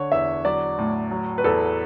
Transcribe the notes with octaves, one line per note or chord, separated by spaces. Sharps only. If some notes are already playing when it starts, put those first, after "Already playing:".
Already playing: D3 C#5
E2 E5
F#3 D5
A2
F#3
B4
E2 A4